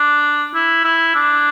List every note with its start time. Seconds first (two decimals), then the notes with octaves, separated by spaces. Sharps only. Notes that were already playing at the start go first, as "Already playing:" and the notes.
Already playing: D4
0.55 E4
0.84 E4
1.15 D4